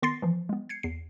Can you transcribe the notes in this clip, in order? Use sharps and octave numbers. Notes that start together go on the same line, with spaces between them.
D#3 B3 C6 A6 A#6 C7
E3 F3
G#3 B3
G#6 C7 C#7
E2 C7